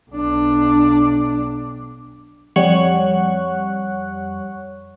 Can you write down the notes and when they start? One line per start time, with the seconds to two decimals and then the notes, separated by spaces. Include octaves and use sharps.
0.10 B1 D4
2.56 F2 G3 C#5 F#5 C#6 F#6